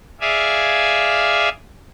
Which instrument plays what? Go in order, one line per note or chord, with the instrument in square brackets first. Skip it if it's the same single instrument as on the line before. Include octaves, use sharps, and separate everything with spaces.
[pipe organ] G#4 D5 E5 F5 G#5